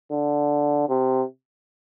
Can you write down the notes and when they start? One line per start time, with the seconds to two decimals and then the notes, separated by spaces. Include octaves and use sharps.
0.12 D3
0.89 C3